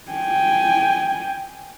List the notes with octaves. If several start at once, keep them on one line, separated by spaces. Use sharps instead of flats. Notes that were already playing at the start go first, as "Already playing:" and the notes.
G5 G#5